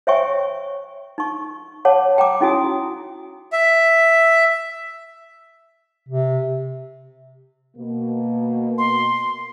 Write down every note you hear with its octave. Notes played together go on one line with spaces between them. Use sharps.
C5 C#5 E5 G5 G#5 C#6
D#4 C#6
C#5 F#5 A5 D6
G5 A#5 D6
C#4 D#4 E4 F#4 G#5 D#6
E5
C3
B2 A#3
C6